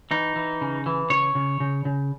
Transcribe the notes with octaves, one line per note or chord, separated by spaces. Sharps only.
E3 D#4
E3
C#3
E3
C#3 C#5
C#3
C#3
C#3